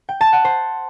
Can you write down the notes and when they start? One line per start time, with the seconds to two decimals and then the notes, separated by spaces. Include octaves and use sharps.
0.09 G5
0.21 A5
0.33 F#5
0.45 C5